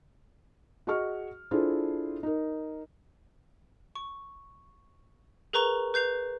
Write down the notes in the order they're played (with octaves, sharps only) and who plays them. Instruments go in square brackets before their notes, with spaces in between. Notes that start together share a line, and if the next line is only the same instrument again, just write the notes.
[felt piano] F#4 G#4 D#5 C#6 F6
D4 E4 F4 G#4 A4 C5
D#4 A#4
[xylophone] C#6
G#4 A#4 B4 A#5 C#6 F7
B4 G6 C7 F7